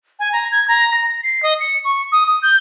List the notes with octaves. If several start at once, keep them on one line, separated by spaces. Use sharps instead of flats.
G#5
A#5
G#6
A#5
A#6
C7
D#5
C#7
C#6
D#6
D#6
G6